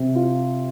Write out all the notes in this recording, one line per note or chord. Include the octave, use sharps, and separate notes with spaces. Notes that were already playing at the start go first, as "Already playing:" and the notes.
Already playing: C3
F4